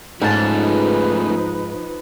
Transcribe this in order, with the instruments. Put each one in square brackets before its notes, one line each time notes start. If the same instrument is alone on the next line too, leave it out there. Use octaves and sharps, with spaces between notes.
[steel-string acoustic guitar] G#2 A5 [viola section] F3 D#4 B4 [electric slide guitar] A3 C#4 G#4